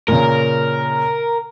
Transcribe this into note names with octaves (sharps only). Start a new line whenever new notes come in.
A#2 C#3 A#4